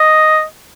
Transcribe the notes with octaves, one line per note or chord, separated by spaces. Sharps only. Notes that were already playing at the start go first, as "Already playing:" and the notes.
Already playing: D#5